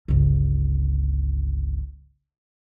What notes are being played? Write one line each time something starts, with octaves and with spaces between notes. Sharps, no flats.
G1 C#2